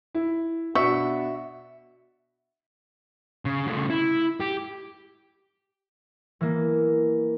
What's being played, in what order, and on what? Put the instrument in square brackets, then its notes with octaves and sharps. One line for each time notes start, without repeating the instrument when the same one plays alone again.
[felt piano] E4
[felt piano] B2 D4 C#7 [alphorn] F#4 [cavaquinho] E5 [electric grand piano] C#6
[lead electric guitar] C#3
C#3 A3
E4
G4
[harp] E3 A#3